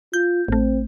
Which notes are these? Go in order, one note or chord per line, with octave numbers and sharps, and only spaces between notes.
F4 G6
A1 A3 C4